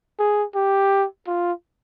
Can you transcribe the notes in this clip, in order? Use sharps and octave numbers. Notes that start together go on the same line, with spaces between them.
G#4
G4
F4